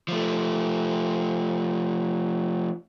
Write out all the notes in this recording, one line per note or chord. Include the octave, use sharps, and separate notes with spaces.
F3 A3